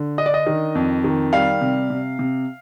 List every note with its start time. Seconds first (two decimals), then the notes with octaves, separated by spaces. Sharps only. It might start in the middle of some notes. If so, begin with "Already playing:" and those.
Already playing: D3
0.18 D4 D#5
0.26 D5
0.34 D#5
0.46 D#3
0.75 F2
1.04 D#3
1.33 G3 F5
1.61 C3
1.90 C3
2.19 C3